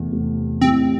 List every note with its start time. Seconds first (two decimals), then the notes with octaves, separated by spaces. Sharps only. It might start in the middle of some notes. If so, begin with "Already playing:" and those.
Already playing: E2 C3 A3
0.12 E2 C3 A3
0.61 A2 G3 C4 E4